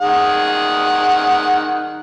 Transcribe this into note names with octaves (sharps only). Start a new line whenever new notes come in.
D#3 G#4 F#5